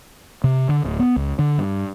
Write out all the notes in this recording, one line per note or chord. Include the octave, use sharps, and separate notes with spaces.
C3
D3
D1
B3
C#2
D3
G2